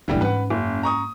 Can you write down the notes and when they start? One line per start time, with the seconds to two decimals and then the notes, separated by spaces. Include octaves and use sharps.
0.08 E1 A1 D3 E3 G3
0.21 G#2 C#4 B4 F#5
0.50 F#1
0.83 A#5 C#6 D#6